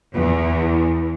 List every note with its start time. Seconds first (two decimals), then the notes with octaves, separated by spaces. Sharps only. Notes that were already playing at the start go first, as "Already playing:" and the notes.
0.16 E2